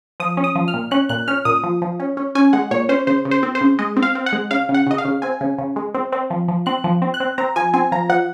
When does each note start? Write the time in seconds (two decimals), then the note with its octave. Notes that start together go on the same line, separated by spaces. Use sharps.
0.20 F3 D#6
0.37 C#4
0.44 D#6
0.55 F3
0.68 F6
0.74 A#2
0.91 C#4 F#6
1.09 A#2 F#6
1.28 C#4 F6
1.45 A#2 D#6
1.64 F3
1.82 F3
2.00 C#4
2.17 C#4
2.35 C#4 G#5
2.53 G#3 F#5
2.71 A#2 C#5
2.89 C#4 C5
3.07 C#3 C5
3.25 C#3
3.31 C5
3.43 C4
3.55 C5
3.61 C#3
3.79 G#3 D#5
3.96 C4
4.02 F5
4.15 C4
4.26 F#5
4.33 G#3
4.51 C#3 F5
4.69 C#3
4.74 F#5
4.87 C#3 D#5
4.98 F5
5.05 C#3
5.22 C4 G#5
5.41 C#3
5.58 C#3
5.76 G#3
5.94 C4
6.12 C4
6.30 F3
6.48 F3
6.66 C4 F#6
6.84 F3
7.02 C4
7.14 F#6
7.20 C4
7.38 C4 A#5
7.56 F3 G#5
7.74 C4 G#5
7.92 F3 A#5
8.09 F3 F#5